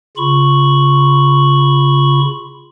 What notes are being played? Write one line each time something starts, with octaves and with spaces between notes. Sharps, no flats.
C#3 F4 B5 C#6